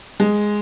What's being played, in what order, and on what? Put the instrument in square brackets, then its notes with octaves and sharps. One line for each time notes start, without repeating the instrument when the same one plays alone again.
[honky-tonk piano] G#3